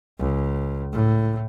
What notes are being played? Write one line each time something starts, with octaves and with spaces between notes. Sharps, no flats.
C#2
A2